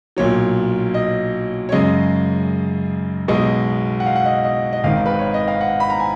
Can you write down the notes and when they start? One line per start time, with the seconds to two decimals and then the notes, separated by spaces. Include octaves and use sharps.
0.17 B1 A#2 F#3 C#5
0.94 D#5
1.69 C#5
1.72 F#2 C#3 G#3 D#5
3.28 B1 B2 G#3 D#5
4.00 F#5
4.06 F5
4.16 F#5
4.25 D#5
4.44 D#5
4.73 D#5
4.84 G#1 G#2 D#3 F5
5.06 B4
5.19 C#5
5.34 D#5
5.48 F5
5.61 F#5
5.80 B5
5.90 A#5
6.00 G#5